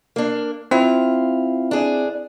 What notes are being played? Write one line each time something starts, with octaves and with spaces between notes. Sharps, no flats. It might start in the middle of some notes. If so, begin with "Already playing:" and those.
A#3 D4
C4 E4 F4
D4 G#4